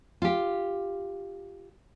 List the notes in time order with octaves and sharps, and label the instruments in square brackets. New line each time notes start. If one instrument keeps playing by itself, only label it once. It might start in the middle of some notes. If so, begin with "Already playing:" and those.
[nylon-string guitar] F4 G4